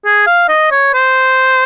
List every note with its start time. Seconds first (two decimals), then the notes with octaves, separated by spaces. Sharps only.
0.05 G#4
0.27 F5
0.49 D#5
0.71 C#5
0.94 C5